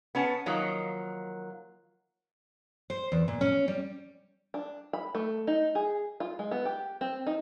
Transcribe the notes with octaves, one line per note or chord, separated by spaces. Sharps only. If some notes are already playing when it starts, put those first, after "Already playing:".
B3 C#4 A5
D#3 F3 F#3 A#3
C5
E2
A#2
C#4
G3
D4
B5
A3
D#4
G#4
F4
G#3
B3
G4
C4
D#4